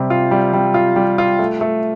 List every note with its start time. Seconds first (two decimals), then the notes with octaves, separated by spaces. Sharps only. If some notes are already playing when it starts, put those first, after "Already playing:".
Already playing: C3 G3
0.10 F4
0.31 G3
0.53 G3
0.74 F4
0.96 G3
1.18 F4
1.39 A3
1.61 A3